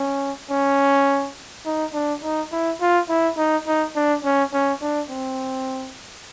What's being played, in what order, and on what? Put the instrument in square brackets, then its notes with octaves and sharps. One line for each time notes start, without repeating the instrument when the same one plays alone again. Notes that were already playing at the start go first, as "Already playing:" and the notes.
Already playing: [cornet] C#4
C#4
D#4
D4
D#4
E4
F4
E4
D#4
D#4
D4
C#4
C#4
D4
C4